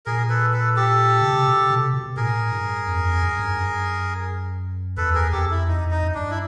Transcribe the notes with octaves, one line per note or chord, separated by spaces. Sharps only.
A#2 G#4 A#4
A4 B4
A4 B4
G4 A4
C#3
C3
B2
C3
B2
A2 G#4 A#4
G2
F2
F2
F#2
G2
F#2
E2 A4 B4
G#4 A#4
F2 G4 A4
E4
F2 D#4
F2
D#4
F#2
D4
G2
E4